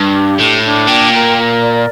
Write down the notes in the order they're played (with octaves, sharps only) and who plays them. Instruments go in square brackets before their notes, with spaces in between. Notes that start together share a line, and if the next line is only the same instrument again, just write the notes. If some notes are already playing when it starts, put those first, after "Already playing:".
Already playing: [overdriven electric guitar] G2 [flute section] D4
[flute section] G4
[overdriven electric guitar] A2 [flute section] D4
[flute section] D4
[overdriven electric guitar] A#2 [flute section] G5
[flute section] A#4
A#4
D5